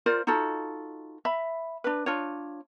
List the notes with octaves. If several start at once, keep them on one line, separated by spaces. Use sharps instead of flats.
F4 A#4 C5 D5
D#4 F4 F#4 A4
E5 B5
D4 B4
D4 F4 C#5